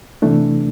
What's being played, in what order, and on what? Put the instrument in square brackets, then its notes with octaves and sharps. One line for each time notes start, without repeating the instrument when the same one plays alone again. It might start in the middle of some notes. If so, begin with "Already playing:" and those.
[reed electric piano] C3 E3 A3 D4